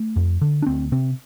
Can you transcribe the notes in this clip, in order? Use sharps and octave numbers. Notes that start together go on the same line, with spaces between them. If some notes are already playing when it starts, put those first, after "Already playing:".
Already playing: A3
F2
D3
D4
D2 C4
C3 C4